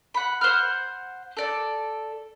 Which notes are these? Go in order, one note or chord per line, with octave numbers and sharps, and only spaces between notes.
F#5 B5
C5 F#5 F6
A4 D5